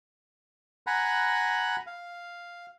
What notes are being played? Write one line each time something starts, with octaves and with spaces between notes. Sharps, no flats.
F#5 G#5 A#5 B5 F#6
F5